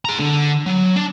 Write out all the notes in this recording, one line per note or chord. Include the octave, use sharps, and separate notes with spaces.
G#4 A#5
D3
F#3
D4